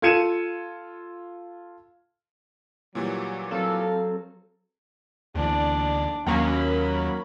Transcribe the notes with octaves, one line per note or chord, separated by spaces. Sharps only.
F4 A4 G#6 C#7 D#7 E7
A#2 E3 F#3 G3
F#3 C4 A4 F5
D2 E3 D4 D5
D#2 F#3 A#3 C#4 B5